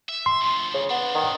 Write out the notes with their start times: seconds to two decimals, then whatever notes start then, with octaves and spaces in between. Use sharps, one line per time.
0.09 E5
0.26 C6
0.41 D2 F3
0.74 C#3
0.90 B3 C4 D4
1.15 D#3